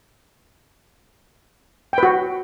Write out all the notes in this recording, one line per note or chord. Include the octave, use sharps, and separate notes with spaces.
F#4 B4 G5